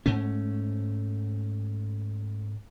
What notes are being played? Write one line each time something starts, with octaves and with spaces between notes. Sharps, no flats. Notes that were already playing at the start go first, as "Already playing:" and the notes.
G#2 A3 C#4